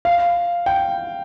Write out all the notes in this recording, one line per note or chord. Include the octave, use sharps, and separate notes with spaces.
F5
G5